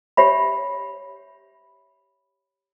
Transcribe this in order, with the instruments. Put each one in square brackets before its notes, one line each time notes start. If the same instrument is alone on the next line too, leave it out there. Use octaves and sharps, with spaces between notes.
[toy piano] G4 C#5 E5 B5